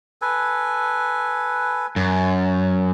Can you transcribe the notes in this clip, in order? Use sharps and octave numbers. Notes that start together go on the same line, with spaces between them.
A4 B4 G#5
F#2